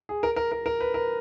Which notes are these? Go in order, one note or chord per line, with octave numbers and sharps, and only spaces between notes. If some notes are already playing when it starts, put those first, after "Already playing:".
G#4
A#4
A#4
A#4
A#4
B4
A#4